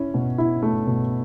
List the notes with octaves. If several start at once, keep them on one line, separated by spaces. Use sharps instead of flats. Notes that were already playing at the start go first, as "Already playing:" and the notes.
Already playing: C#4 E4
B2
E4
A3
B2